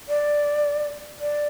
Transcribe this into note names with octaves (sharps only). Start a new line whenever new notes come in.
D5
D5